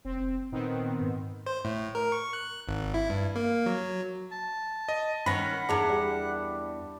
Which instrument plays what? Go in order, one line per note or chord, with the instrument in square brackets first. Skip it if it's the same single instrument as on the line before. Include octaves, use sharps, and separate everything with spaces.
[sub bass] F1 [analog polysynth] C4
[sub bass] A#2 [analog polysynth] D#3 B3 C4
[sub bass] G#2
[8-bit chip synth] C5
A2
A#4
C#6
F#6
G#1
E4
G2
A#3
F#3
[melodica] A5
[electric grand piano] D#5
[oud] D#3 C#4 [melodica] F#5 [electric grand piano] B5 A#6
[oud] E2 G#4 A#4 [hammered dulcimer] D4
[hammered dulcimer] G3